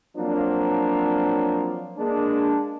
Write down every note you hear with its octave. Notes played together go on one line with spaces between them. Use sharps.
F3 F#3 A#3 C4 D4
G#3 A#3 D4